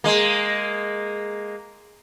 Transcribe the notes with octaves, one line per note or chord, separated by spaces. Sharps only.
G#3 A#3